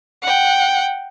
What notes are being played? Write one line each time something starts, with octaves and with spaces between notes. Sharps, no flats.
F#5 G5